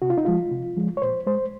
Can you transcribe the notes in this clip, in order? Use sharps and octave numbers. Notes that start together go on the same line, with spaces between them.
C3 F#4
F4
D#4
F3 G#3 F4
C3
F3 G#3
C#5
A#2 C5
G#3 C5